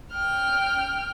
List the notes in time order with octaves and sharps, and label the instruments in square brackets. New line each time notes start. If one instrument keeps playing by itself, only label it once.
[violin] G5 F6